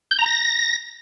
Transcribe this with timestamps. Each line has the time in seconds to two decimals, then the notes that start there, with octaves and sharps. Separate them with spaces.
0.11 G6
0.19 A#5
0.26 A#6